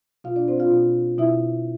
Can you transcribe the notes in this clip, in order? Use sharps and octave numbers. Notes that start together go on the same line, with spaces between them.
B2 F4 F5
D4 D5
C4 C5
F4 F5
B2
B2 E4 E5